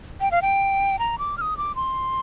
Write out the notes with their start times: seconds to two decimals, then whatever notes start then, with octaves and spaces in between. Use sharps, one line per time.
0.21 G5
0.31 F5
0.42 G5
0.99 A#5
1.18 D6
1.38 F6
1.41 D#6
1.57 D6
1.76 C6